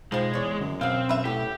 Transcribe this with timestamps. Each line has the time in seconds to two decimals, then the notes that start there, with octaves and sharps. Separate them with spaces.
0.12 G#2 B2 F3 G#3 C4
0.33 E2 C#5 D5
0.60 F#2 D3
0.81 B2 B3 C4 F5
1.09 F#2 B4 E5
1.25 A2 B3 G4